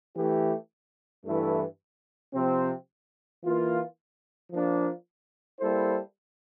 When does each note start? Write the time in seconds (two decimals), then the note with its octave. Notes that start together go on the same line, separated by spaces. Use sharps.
0.15 E3 A3 E4 G4
1.25 G2 E3 A3 E4 A4
2.33 C3 F3 C4
3.43 E3 A#3 F4
4.51 F3 A#3 D4
5.60 G3 A#3 E4 A4 C5